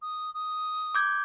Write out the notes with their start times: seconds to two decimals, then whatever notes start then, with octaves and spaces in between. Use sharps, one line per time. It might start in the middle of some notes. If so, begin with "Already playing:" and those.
0.02 D#6
0.34 D#6
0.95 D6 G6 G#6